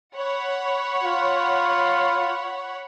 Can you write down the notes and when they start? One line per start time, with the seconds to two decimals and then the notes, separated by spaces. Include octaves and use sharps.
0.15 C#5 F#5 B5
1.04 F4